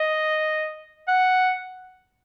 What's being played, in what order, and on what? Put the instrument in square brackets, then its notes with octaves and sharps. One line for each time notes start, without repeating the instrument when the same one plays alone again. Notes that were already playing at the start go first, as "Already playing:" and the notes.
Already playing: [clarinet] D#5
F#5